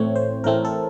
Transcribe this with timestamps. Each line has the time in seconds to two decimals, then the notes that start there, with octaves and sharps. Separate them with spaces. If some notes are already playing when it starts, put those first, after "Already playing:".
Already playing: A1 A2 A3 C4 C#5
0.16 C5
0.44 A1 A2 A3 C4 A#4
0.65 A4